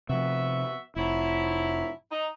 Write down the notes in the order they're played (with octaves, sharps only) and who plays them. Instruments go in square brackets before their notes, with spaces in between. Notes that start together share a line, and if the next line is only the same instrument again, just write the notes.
[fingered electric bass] C3 F3 [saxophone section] B3 F#4 E5
[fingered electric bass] F1 [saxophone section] F3 F#3 E4
[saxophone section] D#4